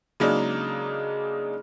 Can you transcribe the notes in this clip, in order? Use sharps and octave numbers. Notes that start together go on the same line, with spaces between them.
C#3 F#3 G#3 A#3 D4 D#4